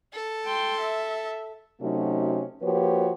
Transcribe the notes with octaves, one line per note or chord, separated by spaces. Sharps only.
A4
G5 C6
E5
C3 F#3 A3 C#4 D#4 F#4
F3 A#3 F#4 G4 B4 C#5